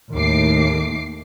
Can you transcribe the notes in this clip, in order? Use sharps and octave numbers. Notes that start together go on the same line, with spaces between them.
D#2 A2 D6 C7